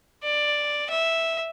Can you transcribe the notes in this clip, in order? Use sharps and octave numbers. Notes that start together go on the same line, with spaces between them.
D5
E5